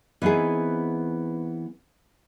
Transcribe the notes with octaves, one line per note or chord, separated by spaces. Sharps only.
E3 B3 C4 D#4 G#4